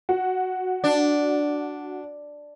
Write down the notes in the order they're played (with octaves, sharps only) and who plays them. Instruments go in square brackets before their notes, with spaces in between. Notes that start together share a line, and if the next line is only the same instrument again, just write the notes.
[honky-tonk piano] F#4
[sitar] D4